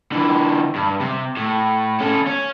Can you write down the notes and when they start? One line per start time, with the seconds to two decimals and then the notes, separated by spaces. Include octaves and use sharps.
0.12 D3 E3
0.75 G2
1.00 C3
1.37 A2
2.00 C#4 A4
2.27 C#4